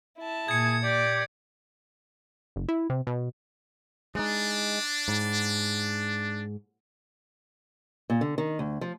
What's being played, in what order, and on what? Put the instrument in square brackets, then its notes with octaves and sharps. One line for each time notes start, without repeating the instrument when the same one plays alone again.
[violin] E4 A5
[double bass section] A#2 [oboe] G#4 [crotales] G#6 C#7
[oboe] G4 [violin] D5
[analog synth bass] F#1
E4
C3
B2
[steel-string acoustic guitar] G#3 D#4 [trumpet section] D4
[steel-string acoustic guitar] G#2
A#2
D3
D#3
D2
F3